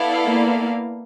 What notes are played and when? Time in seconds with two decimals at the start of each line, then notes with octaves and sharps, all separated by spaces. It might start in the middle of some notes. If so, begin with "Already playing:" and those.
Already playing: B3 E4 A4 D5 F5
0.26 A#3